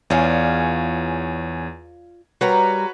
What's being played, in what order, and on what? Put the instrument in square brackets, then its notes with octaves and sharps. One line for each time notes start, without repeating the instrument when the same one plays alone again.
[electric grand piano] E2 C#5 G#5 [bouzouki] F4 D5 F5
[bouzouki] G3 A#4 A#5 [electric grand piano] F#4 B4 C#5